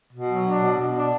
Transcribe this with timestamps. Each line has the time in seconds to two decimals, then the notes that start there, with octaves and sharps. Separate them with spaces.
0.13 B2
0.29 F#3
0.45 D4
0.61 B2
0.78 B2
0.94 D4